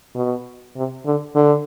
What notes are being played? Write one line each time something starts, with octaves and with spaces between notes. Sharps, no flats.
B2
C3
D3
D3